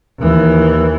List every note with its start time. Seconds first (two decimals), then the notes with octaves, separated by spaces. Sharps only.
0.19 D#2 E3